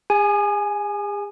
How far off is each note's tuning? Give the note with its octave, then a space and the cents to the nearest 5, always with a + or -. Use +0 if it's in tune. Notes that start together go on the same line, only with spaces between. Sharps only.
G#4 -40 G#5 +5